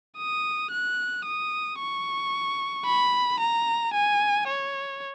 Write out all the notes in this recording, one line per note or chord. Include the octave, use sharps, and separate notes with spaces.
D#6
F#6
D#6
C#6
B5
A#5
G#5
C#5